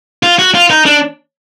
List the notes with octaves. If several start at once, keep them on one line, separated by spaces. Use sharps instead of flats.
F4
F#4
F4
D#4
D4